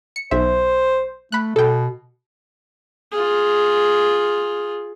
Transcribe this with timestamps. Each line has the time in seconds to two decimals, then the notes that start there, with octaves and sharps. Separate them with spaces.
0.16 C#7
0.31 B1 C5 E5
1.32 A3 B5 F#6
1.56 B2 A4 G5
3.12 F4 G#4